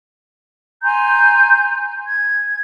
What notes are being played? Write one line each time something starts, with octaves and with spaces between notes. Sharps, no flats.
G#5 A#5 C6 G6
G#6